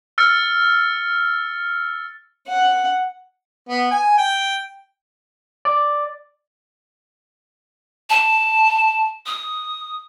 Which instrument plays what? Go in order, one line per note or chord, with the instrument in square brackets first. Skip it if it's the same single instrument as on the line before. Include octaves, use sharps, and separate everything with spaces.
[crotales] E6 F6 A6 C#7
[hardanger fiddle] F#5
[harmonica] B3
G#5
G5
[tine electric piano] D5
[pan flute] A5
D#6